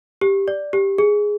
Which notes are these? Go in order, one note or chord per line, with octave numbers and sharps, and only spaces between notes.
G4
D5
G4
G#4